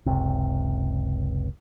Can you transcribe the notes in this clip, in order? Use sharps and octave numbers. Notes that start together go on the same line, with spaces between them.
F#1 C#2 C3